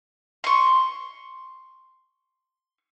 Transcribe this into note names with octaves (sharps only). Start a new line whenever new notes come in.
C6 C#6